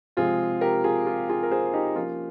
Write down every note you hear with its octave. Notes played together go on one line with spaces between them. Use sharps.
C3 F3 G#3 C4 F4 G#4
G4 A#4
F4 G#4
F4
F4 G#4
A#4
G#4 C5
D#4 G4
F3 A#3 C#4 F4